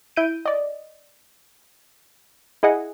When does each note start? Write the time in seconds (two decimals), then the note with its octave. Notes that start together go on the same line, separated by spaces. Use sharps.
0.16 E4 G6 D7 D#7
0.46 D5 D#5
2.63 E4 G#4 D#5 F#5 G#5